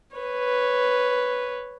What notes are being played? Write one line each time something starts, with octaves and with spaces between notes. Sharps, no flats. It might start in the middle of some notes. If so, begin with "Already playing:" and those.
B4 C#5